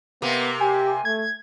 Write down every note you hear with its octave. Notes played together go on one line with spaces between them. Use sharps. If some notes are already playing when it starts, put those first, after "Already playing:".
C3 A#3 B3
G4 G#5
A3 G#6